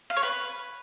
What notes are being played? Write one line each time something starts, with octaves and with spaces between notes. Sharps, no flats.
F5
C#5
B4